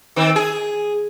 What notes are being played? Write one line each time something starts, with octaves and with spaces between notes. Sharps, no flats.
D#3 C4
G#4